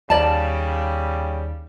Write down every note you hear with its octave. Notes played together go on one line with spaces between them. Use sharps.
D#2 C#3 G3 D5 A5